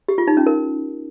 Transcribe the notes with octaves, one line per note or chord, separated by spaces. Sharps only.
G4
F4
D#4
C#4
A#4